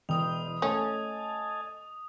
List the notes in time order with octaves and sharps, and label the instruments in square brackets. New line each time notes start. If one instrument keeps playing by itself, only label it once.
[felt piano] E1 [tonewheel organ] E3 D#5 G5 [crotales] D#6 F7
[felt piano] A3 [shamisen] C#4 [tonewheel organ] D#5 G#5 A5